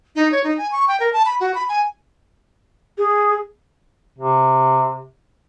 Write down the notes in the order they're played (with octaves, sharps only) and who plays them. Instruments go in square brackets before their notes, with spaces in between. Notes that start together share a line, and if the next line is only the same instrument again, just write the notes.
[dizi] D#4
C#5
D#4
G#5
C#6
G5
A#4
A5
B5
F#4
B5
G#5
[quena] G#4
[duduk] C3